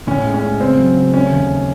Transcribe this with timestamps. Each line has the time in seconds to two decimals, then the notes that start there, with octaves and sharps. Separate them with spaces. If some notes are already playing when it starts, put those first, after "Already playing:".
0.07 A2 C#4
0.26 G#3
0.34 C#4
0.43 G#3
0.60 C#3 C4
0.78 F#3
0.96 C#3
1.14 A3 C#4
1.31 D#2